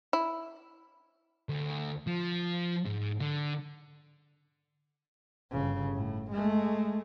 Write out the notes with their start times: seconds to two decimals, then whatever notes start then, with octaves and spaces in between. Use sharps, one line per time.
0.13 E4
1.49 D2
2.07 F3
2.86 G#2
3.21 D3
5.51 G1 C#3
5.95 A2
6.31 G#3 A3